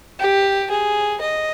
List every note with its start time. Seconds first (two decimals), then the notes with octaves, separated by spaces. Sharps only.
0.20 G4
0.71 G#4
1.22 D#5